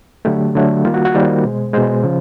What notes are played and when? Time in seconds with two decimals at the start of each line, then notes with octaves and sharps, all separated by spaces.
0.25 D3 F#3 A3 G4
0.55 D3 F#3 A3
0.85 D#3 G3 A#3 F4
0.94 F#4
1.05 F#4
1.14 D#3 G3 A#3 C5
1.44 B2 G#3
1.73 B2 G#3 C5
2.04 C#3 F3